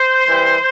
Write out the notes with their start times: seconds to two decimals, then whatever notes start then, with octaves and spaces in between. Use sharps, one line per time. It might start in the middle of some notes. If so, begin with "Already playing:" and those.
Already playing: C5
0.27 E3 G3